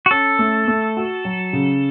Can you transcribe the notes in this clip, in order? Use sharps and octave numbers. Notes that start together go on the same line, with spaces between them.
F#4
C#4 A4
A3
A3
F#4
F#3
C#3